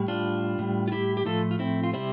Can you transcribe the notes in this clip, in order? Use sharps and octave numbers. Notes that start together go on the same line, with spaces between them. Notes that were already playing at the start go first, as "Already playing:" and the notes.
Already playing: A2 G3
D4 F4
A2 G3
F4
E4 G4
G4
A2 F3 A3 F4 A4
F4
C4 E4
F4
C3 G3 C4 E4